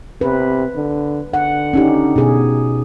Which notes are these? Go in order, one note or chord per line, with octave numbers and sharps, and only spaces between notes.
C3 B4
D3
D3 F#5
C#4 D#4 G4
B2 G#4